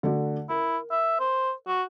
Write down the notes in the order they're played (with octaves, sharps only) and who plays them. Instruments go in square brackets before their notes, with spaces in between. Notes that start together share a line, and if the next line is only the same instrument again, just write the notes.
[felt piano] D3 A3 F#4
[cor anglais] E4 [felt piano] A#4
[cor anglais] E5
C5
F#4